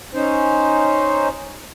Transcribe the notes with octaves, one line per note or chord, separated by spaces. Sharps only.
C#4 D#4 C5